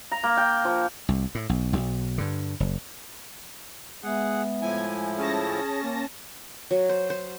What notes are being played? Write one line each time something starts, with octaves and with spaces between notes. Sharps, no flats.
A#5
A#3
G5
F3
C2
A2
B1
B1
G2 D3
F#1
G#3 B3 G#4 E5 F#5
A2 F3 E4 G#5
C#4 G#4 A5 A#6
A#3
F#3
C5
C5